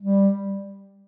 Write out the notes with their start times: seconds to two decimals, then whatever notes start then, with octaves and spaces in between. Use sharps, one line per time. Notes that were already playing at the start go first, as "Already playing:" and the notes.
0.01 G3